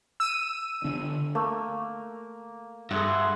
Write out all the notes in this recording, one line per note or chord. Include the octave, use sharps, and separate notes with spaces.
E6 D#7
D3 B3 D4
A3 A#3
G2 G#4 A4 E5 F#5 C6